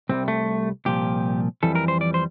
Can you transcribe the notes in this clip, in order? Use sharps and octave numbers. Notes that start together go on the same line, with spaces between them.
C2 C3 G3 C4
A3
C2 A#2 F3 G4
F2 E3 G3 A4
A#4
C5
D5
C5